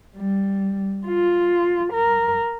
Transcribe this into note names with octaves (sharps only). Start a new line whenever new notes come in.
G3
F4
A#4